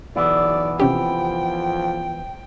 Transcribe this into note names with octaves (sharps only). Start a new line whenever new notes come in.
B1 E3 B3 E4 D5
C3 F3 C#4 G4 G5